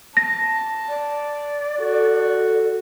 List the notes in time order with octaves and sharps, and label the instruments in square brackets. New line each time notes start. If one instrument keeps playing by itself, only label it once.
[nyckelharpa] A5 [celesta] A#6
[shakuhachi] D5
[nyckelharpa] F#4 [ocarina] A4